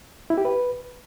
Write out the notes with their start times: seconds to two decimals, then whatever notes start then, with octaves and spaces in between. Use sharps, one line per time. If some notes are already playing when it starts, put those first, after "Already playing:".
0.30 E4
0.38 G4
0.45 B4